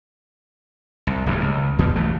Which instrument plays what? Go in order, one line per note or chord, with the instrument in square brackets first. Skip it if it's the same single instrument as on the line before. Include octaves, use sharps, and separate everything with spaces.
[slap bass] C2
D1 A#1 G2
C#2
E2 B2
B1 E3 A3